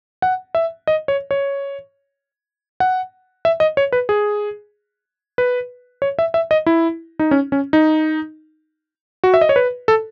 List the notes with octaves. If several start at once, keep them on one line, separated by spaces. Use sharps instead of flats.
F#5
E5
D#5
C#5
C#5
F#5
E5
D#5
C#5
B4
G#4
B4
C#5
E5
E5
D#5
E4
D#4
C#4
C#4
D#4
F#4
E5
D#5
C#5
B4
A4